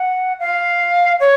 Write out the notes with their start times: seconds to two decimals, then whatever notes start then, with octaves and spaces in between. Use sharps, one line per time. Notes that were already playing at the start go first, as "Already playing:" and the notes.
Already playing: F#5
0.40 F5
1.20 C#5